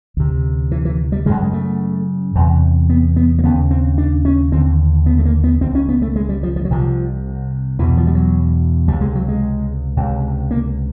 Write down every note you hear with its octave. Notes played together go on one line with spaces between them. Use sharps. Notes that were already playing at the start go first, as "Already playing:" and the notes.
D2 C3
E3
E3
G3
F#2 C#3 G#3
G#3
A3
E2 C3
B3
B3
A#3
D#2 C#3 B3
C4
D4
C#4
D#2 D3 C4
B3
A3
A#3
B3
C#2 C#3 C4
C#4
B3
A3
G#3
G3
F3
F3
F#3
C2 C3 F3
E2 B2 E3
F3
G3
F#3
C#2 C3 G3
G#3
F#3
G#3
C#2 C3
A#3